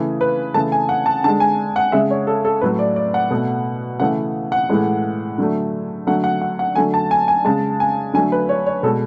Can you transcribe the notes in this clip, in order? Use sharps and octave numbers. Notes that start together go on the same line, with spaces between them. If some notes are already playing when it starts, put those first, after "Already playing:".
Already playing: C#3 E3 A3
B4
C#3 E3 A3 A5
G#5
F#5
A5
D3 G#3 A5
G#5
F#5
C#3 G#3 E5
C#5
A4
A4
A2 F#3 A3 B4
D5
D5
F#5
B2 A3
C#3 E3 A3 F#5
F#5
A2 E3 G#3
D3 F#3 A3
D3 F#3 A3 F#5
F#5
F#5
F#5
D3 F#3 A3 G#5
A5
G#5
G#5
C#3 G#3 A5
G#5
D3 F#3 A3 G#5
B4
C#5
C#5
B2 G#3 A4